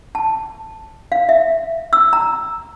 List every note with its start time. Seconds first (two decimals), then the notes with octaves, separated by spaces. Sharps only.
0.15 A5
1.12 F5
1.29 E5
1.93 E6
2.13 A#5